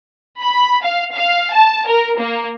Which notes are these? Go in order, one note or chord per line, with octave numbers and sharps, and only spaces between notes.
B5
F5
F5
A5
A#4
A#3